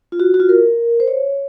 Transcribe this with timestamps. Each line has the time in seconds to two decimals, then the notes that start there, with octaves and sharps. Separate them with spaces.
0.12 F4
0.20 F#4
0.34 F#4
0.40 F4
0.49 A#4
1.00 C5
1.08 C#5